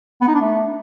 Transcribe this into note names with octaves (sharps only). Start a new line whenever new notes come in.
B3
D#4
D4
A3